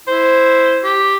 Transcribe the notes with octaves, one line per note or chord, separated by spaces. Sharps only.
E4 C5
G4